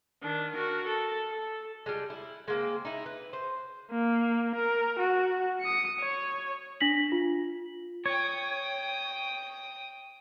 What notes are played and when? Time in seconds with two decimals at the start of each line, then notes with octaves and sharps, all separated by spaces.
0.22 D#3 D4
0.53 F#4 A#4
0.86 A4
1.31 A4
1.86 G3 G#3
2.10 E4
2.48 G#3 A#3 C4
2.85 D#4 E4
3.06 B4
3.33 C5
3.91 A#3
4.55 A#4
4.99 F#4
5.62 D#6 C#7
6.00 C#5
6.80 D4 A#6 B6 F#7
7.12 F4
8.06 C#5 G5 D#6